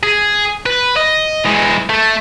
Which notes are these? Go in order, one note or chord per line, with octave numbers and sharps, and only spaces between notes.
G#4
B4
D#5
E3 G#3
A3